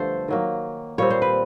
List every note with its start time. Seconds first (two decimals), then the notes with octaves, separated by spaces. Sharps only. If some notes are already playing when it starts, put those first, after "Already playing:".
Already playing: G2 D3 F3 A3 A4 C5
0.28 D#3 F#3 A#3
0.98 A#2 G3 C4 C#5
1.10 C5
1.22 B4